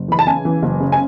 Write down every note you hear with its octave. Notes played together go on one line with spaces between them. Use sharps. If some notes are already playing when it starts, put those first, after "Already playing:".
Already playing: F#1
E3 B5
A5
C#3 G#5
E3
F#1
C#3
G#5